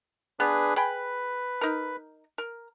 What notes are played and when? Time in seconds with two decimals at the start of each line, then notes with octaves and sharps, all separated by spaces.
0.40 B3 D4 G#4 B4
0.76 G#4 B4 G5 B5
1.61 D#4 A#4
2.38 A#4